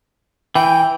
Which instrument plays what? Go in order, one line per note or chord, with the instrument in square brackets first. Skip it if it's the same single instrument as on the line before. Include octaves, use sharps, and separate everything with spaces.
[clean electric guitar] E3 [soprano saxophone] G5